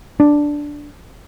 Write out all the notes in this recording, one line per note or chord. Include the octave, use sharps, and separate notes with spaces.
D4